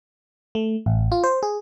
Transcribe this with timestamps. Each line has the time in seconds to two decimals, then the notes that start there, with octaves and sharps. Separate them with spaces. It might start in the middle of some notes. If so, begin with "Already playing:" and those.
0.55 A3
0.86 A1
1.12 F4
1.24 C5
1.43 G#4